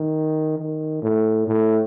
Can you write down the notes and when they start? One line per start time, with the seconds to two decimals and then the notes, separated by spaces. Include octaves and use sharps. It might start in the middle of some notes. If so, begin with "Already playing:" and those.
Already playing: D#3
0.58 D#3
1.02 A2
1.47 A2